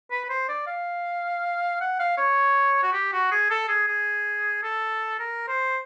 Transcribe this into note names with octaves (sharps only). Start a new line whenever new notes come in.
B4
B4
C5
D5
F5
F#5
F5
C#5
F#4
G4
F#4
G#4
A4
G#4
G#4
A4
A#4
C5